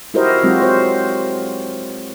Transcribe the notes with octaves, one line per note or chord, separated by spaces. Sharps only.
E4 F#4 G4 A#4 C5 D#5
F#3 G#3 C4 F4 F#4
C5